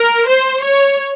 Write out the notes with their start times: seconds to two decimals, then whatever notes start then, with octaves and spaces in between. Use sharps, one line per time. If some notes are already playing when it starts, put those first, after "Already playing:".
Already playing: A#4
0.27 C5
0.63 C#5